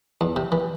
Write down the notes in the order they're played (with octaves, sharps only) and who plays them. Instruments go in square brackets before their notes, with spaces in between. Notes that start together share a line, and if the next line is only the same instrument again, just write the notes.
[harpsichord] E2
C3
E3